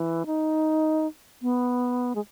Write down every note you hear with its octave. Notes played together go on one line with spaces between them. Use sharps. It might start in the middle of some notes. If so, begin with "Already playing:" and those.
Already playing: E3
D#4
B3
G#3